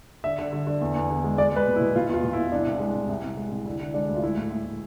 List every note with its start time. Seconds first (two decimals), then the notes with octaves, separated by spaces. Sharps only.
0.24 D3 E5
0.38 D3
0.53 D3
0.67 D3
0.81 E2
0.96 E2
1.10 D3
1.24 G#3
1.38 G#3 D5
1.52 G#3 B4
1.67 B2
1.76 E4
1.81 B2
1.95 B2 F4
2.09 E2 F4
2.24 B2
2.33 E4
2.37 E2
2.52 C2 D4
2.67 C2
2.80 G#3
2.95 C2
3.09 C2
3.24 C2
3.37 G#3
3.52 C2
3.66 D3 E4
3.80 D3
3.94 G#3 D4
4.09 D2
4.17 F4
4.23 G#3 E4
4.37 A2
4.52 A2
4.65 A2